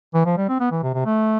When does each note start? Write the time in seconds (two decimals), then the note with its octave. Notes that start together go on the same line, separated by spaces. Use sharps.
0.14 E3
0.26 F3
0.37 G3
0.49 C4
0.60 B3
0.71 E3
0.83 C3
0.94 C3
1.06 A3